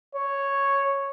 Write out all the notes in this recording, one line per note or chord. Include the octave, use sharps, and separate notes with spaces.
C#5